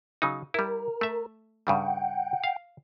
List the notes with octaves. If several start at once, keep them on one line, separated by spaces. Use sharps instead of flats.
C#3 F#3 D#4
G3 E4 A#4
A3 E5
G2 C#3 G3 F#5 G5
F5